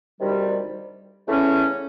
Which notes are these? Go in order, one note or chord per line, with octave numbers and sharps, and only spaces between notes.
D2 C3 D#3 G3
E2 C#3 E3 A3 C#4